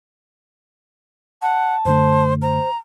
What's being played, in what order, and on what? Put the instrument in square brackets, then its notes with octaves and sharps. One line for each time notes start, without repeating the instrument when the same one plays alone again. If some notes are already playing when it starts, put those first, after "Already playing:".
[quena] F#5 [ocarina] A5
[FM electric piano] F#2 D3 A3 [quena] C5
[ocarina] C5 [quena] A#5